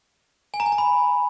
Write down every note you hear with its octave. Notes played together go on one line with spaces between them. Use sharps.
G#5
A#5
G#5
A#5
B5